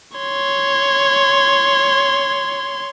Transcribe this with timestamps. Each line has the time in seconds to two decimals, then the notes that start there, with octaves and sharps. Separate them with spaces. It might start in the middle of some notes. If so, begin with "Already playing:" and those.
0.18 C#5 C6